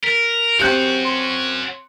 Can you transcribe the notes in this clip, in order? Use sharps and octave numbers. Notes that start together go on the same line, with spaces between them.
A#4 B6
C4 C#4 F#4 G4 F#6 G6 C#7
C6